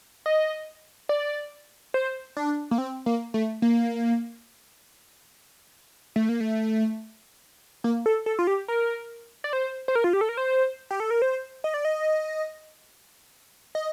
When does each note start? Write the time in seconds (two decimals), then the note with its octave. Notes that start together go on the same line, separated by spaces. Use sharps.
0.26 D#5
1.09 D5
1.94 C5
2.37 D4
2.71 A#3
2.78 C4
3.06 A#3
3.34 A3
3.62 A#3
6.16 A3
6.29 A#3
6.40 A3
7.84 A#3
8.06 A4
8.26 A4
8.39 F4
8.47 G4
8.68 A#4
9.44 D5
9.53 C5
9.88 C5
9.95 A#4
10.04 F4
10.13 G4
10.21 A4
10.29 A#4
10.37 C5
10.91 G4
11.00 A4
11.11 A#4
11.22 C5
11.64 D#5
11.74 D5
11.85 D#5
13.75 D#5